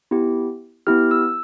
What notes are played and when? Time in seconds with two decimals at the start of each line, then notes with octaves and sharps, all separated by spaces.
0.11 B3 E4 G4
0.87 B3 E4 G4 F6
1.11 E6